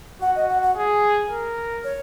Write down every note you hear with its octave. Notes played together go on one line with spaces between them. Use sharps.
F#4 F#5
D#5
F#5
F#5
G#4
A#4
C#5